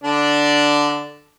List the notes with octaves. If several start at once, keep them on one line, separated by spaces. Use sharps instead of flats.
D3 D4 D5